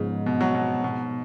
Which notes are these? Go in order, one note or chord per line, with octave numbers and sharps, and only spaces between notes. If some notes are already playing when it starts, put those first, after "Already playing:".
Already playing: G#2 C#3 F3 G#3 B3
B2
F#3
B2
B2